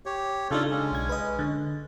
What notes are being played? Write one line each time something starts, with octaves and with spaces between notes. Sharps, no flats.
G4 C#5
C#3 D4 D#4 F4 A4
G#3 C#4
B1 G#6
B4 D#5
D3